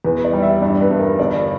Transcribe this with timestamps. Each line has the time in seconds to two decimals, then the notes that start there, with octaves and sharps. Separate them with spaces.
0.04 E2 B4
0.24 D5
0.33 G3
0.42 E5
0.61 G2 D5
0.81 B4
0.91 G2
0.99 A#4
1.19 G1 D5